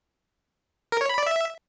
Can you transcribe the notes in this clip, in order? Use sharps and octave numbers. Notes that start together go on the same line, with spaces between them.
A#4
C#5
B5
D5
E5